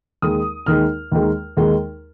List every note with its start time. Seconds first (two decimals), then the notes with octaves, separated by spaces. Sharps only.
0.22 D#2 D#3 G#3 D#6
0.66 D#2 D#3 G#3 F6
1.12 D#2 D#3 G#3
1.57 D#2 D#3 G#3